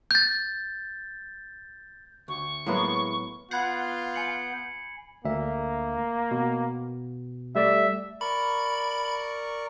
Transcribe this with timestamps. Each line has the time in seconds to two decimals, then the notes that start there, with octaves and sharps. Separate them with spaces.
0.11 G6 A6
2.28 D2 C#6
2.67 A2 F#3 G#3 A#3 B3 E4
3.51 B3 F4 F#5 B5 G6 G#6 C7
4.14 G#5 C#7 F#7
5.25 D2 A#3 E5
6.31 B2
7.55 G3 A3 D5 E5
8.21 A#4 D5 B5 C#6